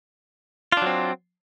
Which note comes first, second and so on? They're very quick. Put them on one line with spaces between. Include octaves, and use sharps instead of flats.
F4 D4 F#3 C4